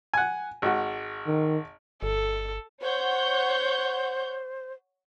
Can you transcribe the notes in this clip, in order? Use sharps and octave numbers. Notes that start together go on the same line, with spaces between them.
F#5 G#5
G#1 F#4
D#3
G1 A4
C5 C#5 F#5 G6